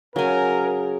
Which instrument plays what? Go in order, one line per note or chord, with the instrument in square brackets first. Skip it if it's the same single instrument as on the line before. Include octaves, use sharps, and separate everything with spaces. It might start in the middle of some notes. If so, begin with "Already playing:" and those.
[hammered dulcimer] C#3 [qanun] F#3 G#5 [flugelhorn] A#4